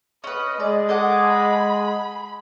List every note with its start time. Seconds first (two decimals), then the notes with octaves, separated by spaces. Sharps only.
0.24 C#4 B4 D#5
0.60 G#3 D5
0.89 A4 D#5 F#5 D6
1.29 B5